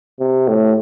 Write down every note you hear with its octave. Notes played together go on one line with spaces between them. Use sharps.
C3
A2